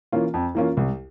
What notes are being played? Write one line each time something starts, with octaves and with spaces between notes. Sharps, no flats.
E3 A#3 C#4 F4
F2
E3 A#3 C#4 F4
C2